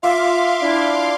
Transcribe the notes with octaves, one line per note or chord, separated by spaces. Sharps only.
F4 E5 F5 C6 D6 E6
D4 E4